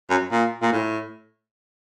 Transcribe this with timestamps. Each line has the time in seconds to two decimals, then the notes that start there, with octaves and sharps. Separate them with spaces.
0.10 F#2
0.31 A#2
0.62 A#2
0.73 A2